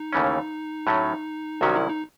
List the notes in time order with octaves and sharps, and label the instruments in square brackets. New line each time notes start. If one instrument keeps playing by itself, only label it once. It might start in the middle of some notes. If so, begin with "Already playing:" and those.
Already playing: [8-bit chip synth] D#4
[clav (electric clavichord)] D#2 C#3 E3 A3 C#4
A2 F#3 A3 C#4
[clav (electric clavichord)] C2 C3 D#3 F#3 C#4 [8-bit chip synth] F#4
[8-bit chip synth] E4
D#4